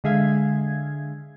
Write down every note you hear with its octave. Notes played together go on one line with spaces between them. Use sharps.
D3 G#3 G#4 E5 F5 G#6